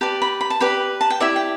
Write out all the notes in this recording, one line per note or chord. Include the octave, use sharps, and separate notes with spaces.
G4 B4 D5 A5
B5
B5
A5
G4 B4 D5 B5
A5
G5
E4 G4 D5 E5
G5